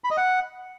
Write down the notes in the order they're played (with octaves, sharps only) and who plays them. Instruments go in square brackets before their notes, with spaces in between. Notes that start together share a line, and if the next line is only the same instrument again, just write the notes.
[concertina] B5
D#5
F#5